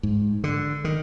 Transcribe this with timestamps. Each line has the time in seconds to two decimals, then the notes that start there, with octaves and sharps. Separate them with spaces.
0.03 G#2
0.44 D3
0.84 D#3